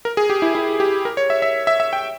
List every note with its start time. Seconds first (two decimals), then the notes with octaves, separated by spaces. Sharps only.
0.05 A#4
0.17 G#4
0.30 G4
0.42 E4
0.55 E4
0.80 G4
1.05 A#4
1.17 C#5
1.30 E5
1.42 E5
1.67 E5
1.80 E5
1.93 G5